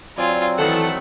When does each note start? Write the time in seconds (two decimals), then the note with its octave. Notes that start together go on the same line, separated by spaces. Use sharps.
0.18 F#3 C4 F4 D5 G#5
0.58 D#3 E3 A3 B3 A4 F#5